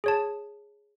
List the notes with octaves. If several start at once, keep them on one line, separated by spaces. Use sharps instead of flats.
G#4 C#5 A5